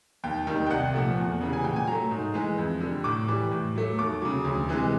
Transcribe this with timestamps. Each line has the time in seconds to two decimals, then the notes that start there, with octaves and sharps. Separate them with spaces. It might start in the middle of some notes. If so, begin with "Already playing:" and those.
0.23 D#2 G5
0.47 D#3 G3
0.67 G5
0.70 C2 F#5
0.94 A#2 F3 A3
1.17 E2
1.41 C#3 E3 G3
1.53 G#5
1.64 A#2 G5
1.76 G#5
1.87 F#3 A3 A#5
2.11 G#2
2.34 E3 G#3
2.58 F2
2.81 D3 G3
3.04 A2 D6
3.28 E3 G3
3.51 A2
3.75 F#3 A3
3.98 D#2 D6
4.22 C#3 F#3
4.44 D2
4.69 C3 E3 G#3